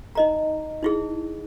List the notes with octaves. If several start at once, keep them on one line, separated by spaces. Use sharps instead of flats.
D#4 D#5 A#5
D#4 E4 G#4